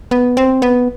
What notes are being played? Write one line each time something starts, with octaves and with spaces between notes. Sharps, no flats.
B3
C4
B3